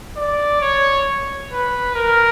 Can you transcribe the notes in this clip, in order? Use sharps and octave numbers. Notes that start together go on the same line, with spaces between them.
D5
C#5
B4
A#4